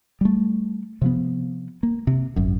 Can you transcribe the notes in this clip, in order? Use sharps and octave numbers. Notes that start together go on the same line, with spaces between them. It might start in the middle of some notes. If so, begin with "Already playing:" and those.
G3 A3
C3 F3 B3
A#3
C3
G#1 F#2